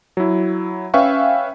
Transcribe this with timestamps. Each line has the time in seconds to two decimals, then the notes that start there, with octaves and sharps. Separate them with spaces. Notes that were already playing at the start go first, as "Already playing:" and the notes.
0.17 F#3 E4
0.94 C#4 B4 E5 F5 G5 C#6